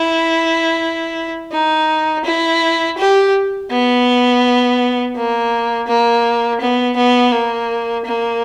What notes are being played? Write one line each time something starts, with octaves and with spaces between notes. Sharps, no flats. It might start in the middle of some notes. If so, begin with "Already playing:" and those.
Already playing: E4
D#4
E4
G4
B3
A#3
A#3
B3
B3
A#3
A#3